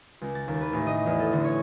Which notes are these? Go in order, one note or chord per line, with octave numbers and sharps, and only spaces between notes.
C#2
A6
D#2
B4
A1
D#5
E2
A4
D3
C#5